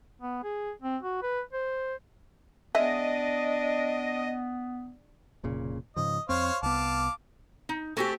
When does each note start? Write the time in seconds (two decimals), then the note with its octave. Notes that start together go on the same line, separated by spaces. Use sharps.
0.22 B3
0.43 G#4
0.82 C4
1.03 F#4
1.22 B4
1.53 C5
2.75 G#3 B3 D4 D#5 E5
5.44 F1 A#2 C#3
5.96 G#2 C#3 F3 D#5
6.29 F2 C4 C5 C#5 F5
6.63 C2 B3 F5 A5 D6
7.69 D#4
7.97 A3 C4 F#4 G4 A4 G#5